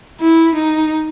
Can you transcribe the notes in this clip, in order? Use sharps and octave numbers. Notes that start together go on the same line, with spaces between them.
E4
D#4